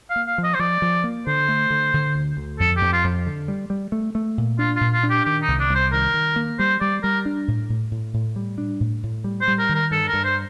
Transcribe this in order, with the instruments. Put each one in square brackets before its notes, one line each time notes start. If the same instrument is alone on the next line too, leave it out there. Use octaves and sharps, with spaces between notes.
[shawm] F5
[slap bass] A#3
[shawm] F5
[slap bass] F3
[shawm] D#5
C5
[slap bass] F3 [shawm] D5
[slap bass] F3
A#3
[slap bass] D3 [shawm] C5
[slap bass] A3
D3
D3
D2
D2
[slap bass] F2 [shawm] A4
[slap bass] F2 [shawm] G4
[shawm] F4
[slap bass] F2
D3
G3
G3
A3
A3
A#2
[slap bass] D4 [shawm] F4
[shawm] F4
[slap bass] A#2
[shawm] F4
[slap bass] D4
[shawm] G4
[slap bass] D#3 [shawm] G4
[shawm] D#4
[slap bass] C2
[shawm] D4
[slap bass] C2
[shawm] C5
[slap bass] D#3 [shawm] A#4
[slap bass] D#3
A#3
[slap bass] G3 [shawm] C5
[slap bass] G3 [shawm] D5
[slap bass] G3 [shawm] A#4
[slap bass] D4
A2
A2
A2
A2
G3
D4
A2
A2
G3
[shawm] C5
[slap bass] G3
[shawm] A#4
[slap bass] D#3
[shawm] A#4
[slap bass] G2 [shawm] A4
[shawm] A#4
[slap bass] G2
[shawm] C5